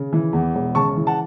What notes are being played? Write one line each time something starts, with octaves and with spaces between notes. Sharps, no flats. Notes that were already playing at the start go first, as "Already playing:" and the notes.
Already playing: C#3
E3
E2
E1
C#3 A5 C#6
E3
F#5 A5